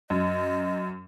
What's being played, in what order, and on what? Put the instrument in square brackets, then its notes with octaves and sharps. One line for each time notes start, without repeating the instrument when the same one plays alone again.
[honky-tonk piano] F#2 [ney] D#5